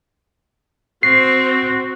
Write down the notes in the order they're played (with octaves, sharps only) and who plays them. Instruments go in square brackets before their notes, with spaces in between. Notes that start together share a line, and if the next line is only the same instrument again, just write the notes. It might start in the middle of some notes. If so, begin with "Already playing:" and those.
[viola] C4 [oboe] F#4 [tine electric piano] C7